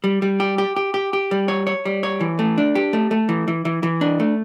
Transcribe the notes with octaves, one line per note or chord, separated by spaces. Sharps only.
G3
G3
G4
G4
G4
G4
G4
G3
C#5
C#5
G3
C#5
E3
A3
D4
G4
A3
A3
E3
E3
E3
E3
D4
A3